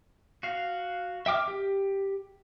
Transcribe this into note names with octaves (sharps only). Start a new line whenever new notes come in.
F#4 F5
E5 G5 D6 F6
G4